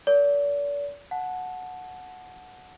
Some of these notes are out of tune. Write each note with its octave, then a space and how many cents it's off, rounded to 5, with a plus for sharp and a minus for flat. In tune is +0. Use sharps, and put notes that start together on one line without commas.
A#4 +0 D5 -40
F#5 -10 A5 -15